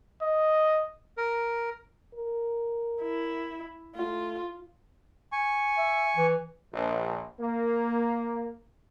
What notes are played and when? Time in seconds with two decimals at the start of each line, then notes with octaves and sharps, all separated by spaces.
0.22 D#5
1.17 A#4
2.15 A#4
3.02 E4
3.96 A3 F4
5.32 G#5 C#6
5.78 E5
6.17 E3
6.72 A#1
7.39 A#3